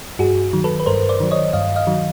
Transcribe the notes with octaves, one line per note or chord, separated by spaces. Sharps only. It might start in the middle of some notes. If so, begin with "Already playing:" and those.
G2 F#4 G#4
D#3 F#3
A4 B4
B4
G2 A#4 C5
C5 D5
D#3 F#3
C#5 D#5
G2 D#5 F5
D#5 F5
D#3 F#3